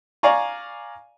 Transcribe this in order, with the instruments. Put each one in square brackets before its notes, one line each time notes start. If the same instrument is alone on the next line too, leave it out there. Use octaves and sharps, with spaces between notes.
[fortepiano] D5 F5 G#5 A#5 C#6